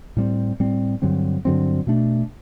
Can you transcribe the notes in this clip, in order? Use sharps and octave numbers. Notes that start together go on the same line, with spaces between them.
A2 G3 C4
A2 G3 C4
G2 D3 F#3 C4
G2 D3 F#3 C4
B2 A3 D4